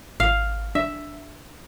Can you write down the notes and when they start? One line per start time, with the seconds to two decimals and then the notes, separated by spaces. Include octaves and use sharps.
0.20 G#1 F5
0.75 D4 E5